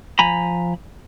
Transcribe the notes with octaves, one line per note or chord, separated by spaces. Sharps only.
F3 G#5 A#5 B5